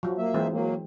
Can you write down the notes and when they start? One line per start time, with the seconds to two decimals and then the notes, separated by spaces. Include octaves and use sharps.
0.03 F3 F#3
0.18 A#3 E5
0.34 E3 G#3 C4
0.51 F#3 A#3